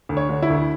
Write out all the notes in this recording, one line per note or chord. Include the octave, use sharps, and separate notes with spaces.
D2
C#5
D3
E4
D2